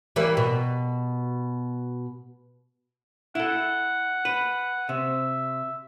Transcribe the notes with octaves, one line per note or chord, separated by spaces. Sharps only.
E3 G3 A#3
B2
E4 A4 F#5
B4
C3 E5